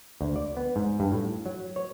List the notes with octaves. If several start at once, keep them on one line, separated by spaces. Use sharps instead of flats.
D2
D5
B3
G#2
G2
A2
F#3
C#5